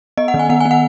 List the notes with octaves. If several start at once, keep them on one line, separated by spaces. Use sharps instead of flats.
B3 D#5
F#5
D#3
G#5
B3 F#5
B3 G#5
F#5